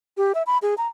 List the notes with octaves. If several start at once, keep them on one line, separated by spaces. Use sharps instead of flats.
G4
E5
B5
G#4
A#5